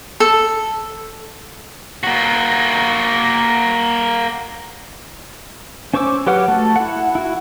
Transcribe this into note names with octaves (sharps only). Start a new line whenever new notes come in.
A4
A#3 F#4
C#4 C5 C#6 D6 E6
F#3 G4 B4 F#5 F6
A3 F#4 A4
E4 F#5
E4 F#4